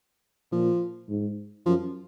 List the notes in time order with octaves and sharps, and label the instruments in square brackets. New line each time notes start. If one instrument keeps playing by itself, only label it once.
[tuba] A#2 [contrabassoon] F3
[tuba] G#2
[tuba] F#2 [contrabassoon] F3